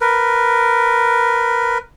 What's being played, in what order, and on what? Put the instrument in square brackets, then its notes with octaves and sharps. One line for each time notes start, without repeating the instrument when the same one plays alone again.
[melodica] A#4 B4